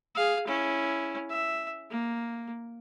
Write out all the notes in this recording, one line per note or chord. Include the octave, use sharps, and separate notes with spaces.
G#4 F5
C#4 E4
E5
A#3